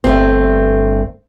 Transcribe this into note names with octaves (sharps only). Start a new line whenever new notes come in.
G1 A3 C4